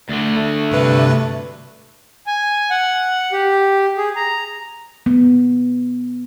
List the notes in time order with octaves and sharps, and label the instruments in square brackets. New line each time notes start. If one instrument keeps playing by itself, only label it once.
[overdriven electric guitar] D2 D3
[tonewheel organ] A3
[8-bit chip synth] G2 C3 B4
[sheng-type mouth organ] G#5
F#5
G4
G#4
A#5
[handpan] B3